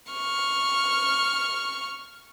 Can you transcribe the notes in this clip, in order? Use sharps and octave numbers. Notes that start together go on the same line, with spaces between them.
C#6 F6